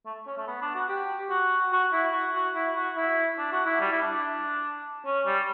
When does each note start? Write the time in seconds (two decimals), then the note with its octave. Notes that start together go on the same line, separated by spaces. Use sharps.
0.06 A3
0.27 C#4
0.37 A3
0.47 B3
0.61 D4
0.75 F#4
0.88 G4
1.30 F#4
1.72 F#4
1.92 E4
2.13 F#4
2.35 F#4
2.55 E4
2.76 F#4
2.96 E4
3.38 D4
3.52 F#4
3.66 E4
3.80 G3
3.92 E4
4.01 D4
5.05 C#4
5.26 G3